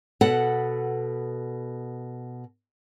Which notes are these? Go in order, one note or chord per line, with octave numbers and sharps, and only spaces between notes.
B2 A4 B4 F#5